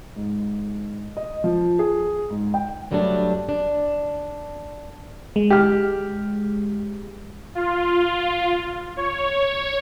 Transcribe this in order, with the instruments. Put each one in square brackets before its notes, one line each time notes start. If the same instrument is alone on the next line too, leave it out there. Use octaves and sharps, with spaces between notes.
[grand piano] G#2
D#5
F3
G#4
G#2
G5
[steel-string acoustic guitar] G2 F#3 G3 A3 C4 D4
D4
[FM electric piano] G#3
[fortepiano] G4 F6
[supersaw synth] F4
C#5